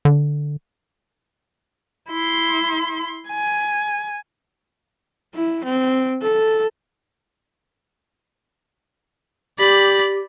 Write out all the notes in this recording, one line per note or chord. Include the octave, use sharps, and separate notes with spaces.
D3
E4 C6
G#5
E4
C4
A4
G4 D5 B5